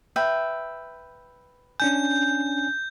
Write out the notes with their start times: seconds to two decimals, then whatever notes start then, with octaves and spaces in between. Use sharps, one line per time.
0.16 B4 E5 G5
1.80 C#4 D4 G#5 G6